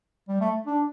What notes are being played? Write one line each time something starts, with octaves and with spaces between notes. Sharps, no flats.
G3
A3
D4